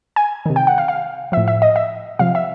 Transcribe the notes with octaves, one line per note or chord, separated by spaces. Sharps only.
G#5
C3 D#3
G5
F#5
F5
F5
F3 E5
A2
E5
D#5
E5
C3 F3 F5
E5